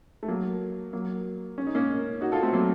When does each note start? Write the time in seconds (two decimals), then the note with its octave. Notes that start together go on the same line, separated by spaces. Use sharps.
0.23 A3
0.28 F#3 A#3
0.93 F#3 A#3
1.58 C#4
1.67 D#4
1.75 A#3 C#4
2.21 D#4 F#4
2.32 F4 A4
2.43 A3 C4
2.53 F#3 A#3